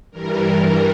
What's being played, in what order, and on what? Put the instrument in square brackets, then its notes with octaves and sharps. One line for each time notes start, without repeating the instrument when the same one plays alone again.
[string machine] G2 E3 G3 A#4